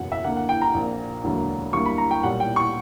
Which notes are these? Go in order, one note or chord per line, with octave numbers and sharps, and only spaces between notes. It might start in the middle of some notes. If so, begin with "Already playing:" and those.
Already playing: F#1 E2 B2 F#3 F#5
E5
D2 D3 A#3 F#5
F#5
G5
A#5
A#1 A#2 A#3
E1 D2 D3 F#3 A#3
D2 D3 G3 A#3 C#6
B5
A#5
G5
B1 A#2 G3 F#5
G5
C#6